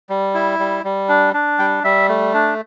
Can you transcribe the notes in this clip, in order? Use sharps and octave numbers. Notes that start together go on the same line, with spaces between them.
G3
E4
G3
G3
D4
D4
G3 G5
G3 E5
A3
D4